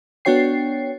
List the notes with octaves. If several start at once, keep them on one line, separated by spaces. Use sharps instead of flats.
B3 D4 F#4 C#5 G5 C7